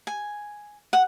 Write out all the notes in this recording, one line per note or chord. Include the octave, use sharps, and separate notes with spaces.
G#5
F#5